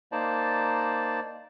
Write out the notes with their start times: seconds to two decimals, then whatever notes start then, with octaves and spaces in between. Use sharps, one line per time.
0.12 A#3 D#4 C5 D5 A5